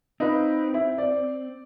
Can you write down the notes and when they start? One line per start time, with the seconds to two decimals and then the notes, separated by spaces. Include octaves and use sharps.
0.20 C4 D#4 F4 B4
0.74 E4
0.98 D5